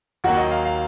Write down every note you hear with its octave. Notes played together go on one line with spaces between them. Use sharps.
D#2 D#3 F#3 A#3 F#4 F#5
D#5
F5
F5